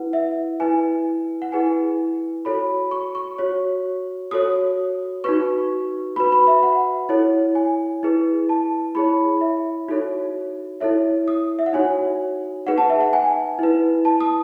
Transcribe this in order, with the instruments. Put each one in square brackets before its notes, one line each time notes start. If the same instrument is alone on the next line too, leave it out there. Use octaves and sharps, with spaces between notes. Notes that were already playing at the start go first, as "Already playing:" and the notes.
Already playing: [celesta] E4 B4 F#5
E5
E4 B4 G#5
F#5
E4 G#4 B4 G#5
F#4 A4 C#5 B5
C#6
C#6
F#4 C#5
F#4 A4 C#5 D#6
D#4 F#4 B4 C#6
F#4 B4 B5
B5
E5
F#5
E4 A4 C#5
G#5
E4 G#4 B4
A5
E4 G#4 C#5 B5
E5
D#4 F#4 A4 C#5
E4 A4 C#5 E5
D#6
E5
F#5
D#4 F#4 C#5 G#5
D#4 G#4 B4 F#5
A5
E5
F#5
G#5
E4 B4
A5
D#6